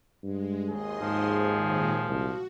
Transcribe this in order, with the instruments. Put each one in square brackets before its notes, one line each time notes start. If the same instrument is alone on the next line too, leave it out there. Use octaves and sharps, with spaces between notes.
[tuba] G2 [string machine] G#3
[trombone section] G#1 D#2 G#4 [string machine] D#5 C6
[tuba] G#2 [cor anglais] F3
[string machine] A#2 D#3 G#3
[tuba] C2 [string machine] F#4